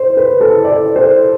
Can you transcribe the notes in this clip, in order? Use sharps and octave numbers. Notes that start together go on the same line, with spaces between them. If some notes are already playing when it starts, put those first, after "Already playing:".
Already playing: C5
B4
A4
D5
C5